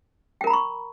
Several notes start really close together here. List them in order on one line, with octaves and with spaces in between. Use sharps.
G5 A#4 A#5 B5 C#6